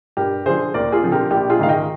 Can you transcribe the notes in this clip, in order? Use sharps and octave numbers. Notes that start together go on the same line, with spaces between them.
G2 G4 A#4
D3 F3 G#4 C5
D#2 A#4 D5
F4 G#4
D3 F3 C4
G4 A#4
A#1 G4
F4 G#4
G#2 D#3 G#3 F5
D#5 G5